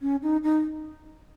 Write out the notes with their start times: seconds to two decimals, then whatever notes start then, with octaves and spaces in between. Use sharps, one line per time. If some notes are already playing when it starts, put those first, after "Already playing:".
0.02 C#4
0.23 D#4
0.44 D#4